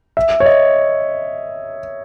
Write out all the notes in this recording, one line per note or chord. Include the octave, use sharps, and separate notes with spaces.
E5
C#5
D#5